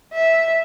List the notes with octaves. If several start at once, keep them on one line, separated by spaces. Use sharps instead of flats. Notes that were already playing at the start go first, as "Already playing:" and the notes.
E5